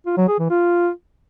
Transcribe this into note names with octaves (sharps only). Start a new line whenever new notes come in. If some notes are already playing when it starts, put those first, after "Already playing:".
F4
F#3
G#4
E3
F4